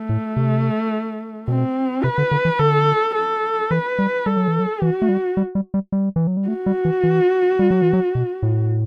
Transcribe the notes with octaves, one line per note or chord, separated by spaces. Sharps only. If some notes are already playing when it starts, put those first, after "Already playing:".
Already playing: A3
A2
C3
B2 C4
C3 B4
D3
D3
E3
D3 A4
A4
E3 B4
G3
G3 A4
F#3
E3
F#3
E3 F#4
A3
G3
G3
G3
G3
G3
E3
F#3
G3
A3 F#4
G3
E3
E3
G3
F#3
E3
F#3
B2
A2